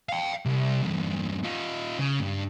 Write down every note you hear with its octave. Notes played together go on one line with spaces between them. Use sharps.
F5 G5
C2
E2 G2
D#4 F4
C#3
G2